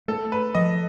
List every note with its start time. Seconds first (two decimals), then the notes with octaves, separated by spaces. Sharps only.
0.08 A3 A4
0.32 B4
0.55 F3 D#5